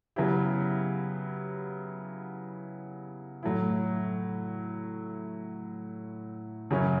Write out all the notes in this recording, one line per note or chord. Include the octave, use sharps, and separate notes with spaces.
C#3 F#3 B3 E4 G4
A2 F#3 A3 E4
F#2 C#3 F#3 C#4